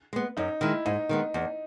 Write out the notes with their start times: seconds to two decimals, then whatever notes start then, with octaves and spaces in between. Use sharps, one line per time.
0.13 G#3 B3
0.37 F#2 D#4
0.61 D#3 G#3 E4
0.86 G#2 D#4
1.09 D#3 G#3 B3
1.34 E2